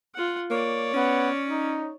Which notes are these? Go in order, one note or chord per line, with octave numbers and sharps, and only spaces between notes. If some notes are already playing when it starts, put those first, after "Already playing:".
F4 F#5
A#3 C#5 D5
B3 C#4
D#4